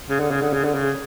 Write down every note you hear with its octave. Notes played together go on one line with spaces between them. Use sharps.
C#3
D3
C#3
D3
C#3
D3
C#3